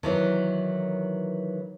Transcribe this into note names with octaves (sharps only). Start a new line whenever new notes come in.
D#3 E3 F#3